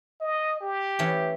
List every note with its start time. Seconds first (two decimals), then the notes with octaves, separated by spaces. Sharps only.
0.21 D#5
0.61 G4
0.99 E3 A3 C#4